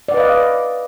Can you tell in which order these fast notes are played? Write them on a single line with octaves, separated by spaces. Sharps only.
D5 F#5 B4 D#5 F5